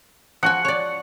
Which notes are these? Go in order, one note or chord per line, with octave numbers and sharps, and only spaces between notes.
F3 F#4 F#5 G#5
C#5 D5